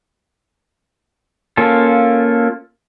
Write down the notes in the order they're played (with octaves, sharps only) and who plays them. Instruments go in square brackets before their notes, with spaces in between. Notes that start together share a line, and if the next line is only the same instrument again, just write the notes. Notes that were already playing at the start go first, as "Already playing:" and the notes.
[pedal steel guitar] A#3 C#4 F4 A4